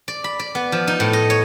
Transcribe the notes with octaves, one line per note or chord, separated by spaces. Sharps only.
D5
B5
D5
B3
F3
D#4
A2
D#5
C#5